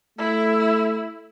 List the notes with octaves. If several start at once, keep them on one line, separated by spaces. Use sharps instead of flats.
A3 E4